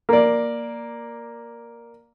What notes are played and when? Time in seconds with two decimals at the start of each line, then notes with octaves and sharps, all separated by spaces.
0.09 A#3 D5